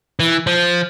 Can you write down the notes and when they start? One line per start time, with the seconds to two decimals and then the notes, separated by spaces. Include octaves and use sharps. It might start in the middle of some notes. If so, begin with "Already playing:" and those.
0.20 E3
0.47 F3